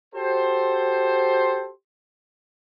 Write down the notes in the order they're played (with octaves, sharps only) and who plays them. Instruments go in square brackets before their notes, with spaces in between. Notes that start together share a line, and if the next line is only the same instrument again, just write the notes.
[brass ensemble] F#4 G4 A4 C5